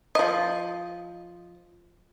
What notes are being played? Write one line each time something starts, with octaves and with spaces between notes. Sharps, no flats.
F3 D#5